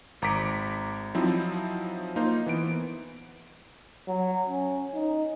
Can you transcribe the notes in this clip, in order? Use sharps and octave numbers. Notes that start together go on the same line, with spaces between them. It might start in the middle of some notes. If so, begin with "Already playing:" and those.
G#1 A#5 D6 B6 D7
F3 F#3 C4 D#4 E4
A#3 D#4 F4 C5
E3 B3 D7
F#3
C#4
D#4